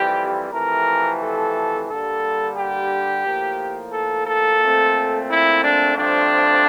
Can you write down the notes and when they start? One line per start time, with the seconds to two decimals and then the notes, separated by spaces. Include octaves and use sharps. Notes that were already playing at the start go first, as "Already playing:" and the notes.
Already playing: F2 E3 G3 C4 G4
0.52 F2 C3 E3 A3 A#4
1.20 A4
1.88 G2 D3 G3 A#3 A4
2.55 G4
3.24 A2 F3 A#3
3.91 A4
4.25 A4
4.60 A#2 A3 C4
5.29 E4
5.62 D4
5.96 G2 F3 A3 C4 D4